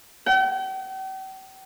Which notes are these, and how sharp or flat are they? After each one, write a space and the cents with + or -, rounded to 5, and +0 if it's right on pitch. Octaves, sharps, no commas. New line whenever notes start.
G5 -45